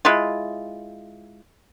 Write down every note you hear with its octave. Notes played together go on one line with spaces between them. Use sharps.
G#3 E4 F4